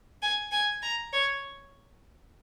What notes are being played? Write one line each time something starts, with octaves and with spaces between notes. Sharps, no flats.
G#5
G#5
A#5
C#5